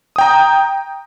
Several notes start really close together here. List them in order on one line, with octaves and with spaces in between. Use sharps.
D#6 G5 A#5